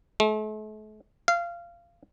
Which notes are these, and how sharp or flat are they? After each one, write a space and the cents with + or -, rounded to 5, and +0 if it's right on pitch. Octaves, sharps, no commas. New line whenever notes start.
A3 -45
F5 -20